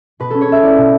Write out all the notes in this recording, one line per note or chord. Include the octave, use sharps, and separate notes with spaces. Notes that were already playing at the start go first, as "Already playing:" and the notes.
B2 B4
C#4 A4
C#5
C#4 E5
E4 D5
B2